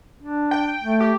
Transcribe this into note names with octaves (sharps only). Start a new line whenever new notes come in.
D4
G5
A3
G4